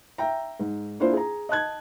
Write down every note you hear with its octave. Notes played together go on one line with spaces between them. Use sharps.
E5 G5 A#5
G#2
A#3 D4 E4 F4 C5
G#4 A#5
D#5 A5 F#6 G#6